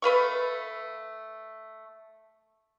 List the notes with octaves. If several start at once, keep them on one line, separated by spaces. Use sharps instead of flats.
A3 B4 F5 C#6